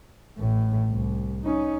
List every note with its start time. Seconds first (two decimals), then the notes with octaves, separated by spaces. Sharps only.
0.38 A1 A2
0.88 C2
1.44 C#4 D#4